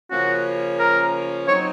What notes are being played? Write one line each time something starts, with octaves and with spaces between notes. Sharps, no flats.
C#3 F3 A#3 C#4 F#4
A#4
F#3 C4 D#4 C#5